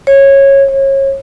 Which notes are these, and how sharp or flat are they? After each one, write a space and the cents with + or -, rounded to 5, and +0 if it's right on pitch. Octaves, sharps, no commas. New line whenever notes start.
C#5 -15
C#5 -30